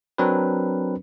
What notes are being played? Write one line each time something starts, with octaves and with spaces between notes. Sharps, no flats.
F#3 C4 D4 A#4 B4